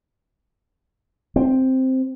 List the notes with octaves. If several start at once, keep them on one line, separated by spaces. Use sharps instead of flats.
C4